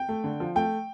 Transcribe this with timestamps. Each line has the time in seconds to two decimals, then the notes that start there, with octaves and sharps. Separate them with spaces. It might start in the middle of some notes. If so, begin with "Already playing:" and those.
Already playing: G5
0.09 A3
0.24 D3
0.40 F3
0.56 A3 G5